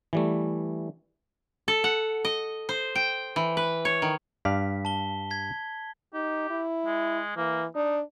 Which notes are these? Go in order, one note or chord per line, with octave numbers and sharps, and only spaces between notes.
E3 G3 A3
A4
F#5
D#5
C5
G5
E3
B4
C#5
D#3
G2 D5 F5 B6
A5 G7
G#6 B6
D#4 G4
E4
G#3
E3 A#3
D4 D#4